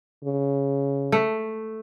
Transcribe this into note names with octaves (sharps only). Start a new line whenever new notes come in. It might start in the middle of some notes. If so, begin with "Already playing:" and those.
C#3
A3